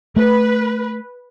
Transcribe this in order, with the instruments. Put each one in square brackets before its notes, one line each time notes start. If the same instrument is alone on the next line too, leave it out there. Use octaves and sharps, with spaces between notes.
[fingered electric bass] A3 [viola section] B4